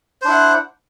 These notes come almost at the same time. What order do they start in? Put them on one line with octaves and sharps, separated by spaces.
C5 D4 E4 F#5